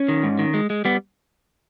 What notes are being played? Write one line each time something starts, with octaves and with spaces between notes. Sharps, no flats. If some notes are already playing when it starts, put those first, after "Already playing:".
Already playing: C#4
D#3
G#2
D#3
G#3
G#3
G3 B3